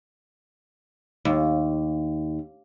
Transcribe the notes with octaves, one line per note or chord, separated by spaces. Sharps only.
D#2